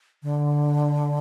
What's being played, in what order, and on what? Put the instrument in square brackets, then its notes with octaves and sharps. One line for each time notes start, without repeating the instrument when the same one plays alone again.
[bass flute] D3